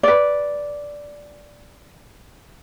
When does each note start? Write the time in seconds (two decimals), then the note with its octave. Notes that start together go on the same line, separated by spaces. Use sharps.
0.03 B4 D5